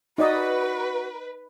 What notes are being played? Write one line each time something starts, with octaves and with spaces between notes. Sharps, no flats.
D#4 F#4 B4 D5 D#5